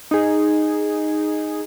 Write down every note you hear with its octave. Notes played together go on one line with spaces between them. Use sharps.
D#4 G#4